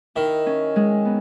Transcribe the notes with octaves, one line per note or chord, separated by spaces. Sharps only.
D#3 E4
C#4
G#3
B3